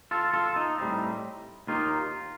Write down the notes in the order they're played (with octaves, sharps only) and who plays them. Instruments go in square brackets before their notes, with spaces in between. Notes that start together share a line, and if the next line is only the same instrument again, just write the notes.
[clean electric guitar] F4 A4
F4 A4
D#4
A2 G3 C4 D#4
D#2 D#3 A#3 D#4 F4